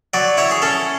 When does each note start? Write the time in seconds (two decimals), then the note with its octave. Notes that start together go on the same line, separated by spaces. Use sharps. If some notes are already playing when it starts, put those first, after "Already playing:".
0.14 F#3 D5
0.37 E4 C#5
0.51 G#4
0.62 C#4 A4